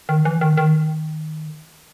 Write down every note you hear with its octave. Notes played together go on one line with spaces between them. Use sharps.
D#3
E3
D#3
D#3